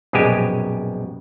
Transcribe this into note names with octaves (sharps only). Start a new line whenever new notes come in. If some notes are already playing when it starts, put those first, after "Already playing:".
A#1 F#2 B2 G#3 G4 G#5